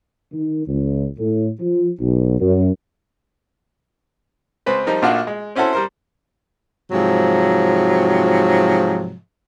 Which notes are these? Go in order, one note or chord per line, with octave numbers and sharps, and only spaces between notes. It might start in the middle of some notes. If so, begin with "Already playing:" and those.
D#3
C#2
A2
F3
B1
F#2
C#2 C4 B4 C5
F3 G3 D#4 A#4
A#1 A#2 A3 D4 F4 F#4
G#3
C4 C#4 E4 F#4 A4 C5
G3 A#4 C5
G#2 C3 F3 F#3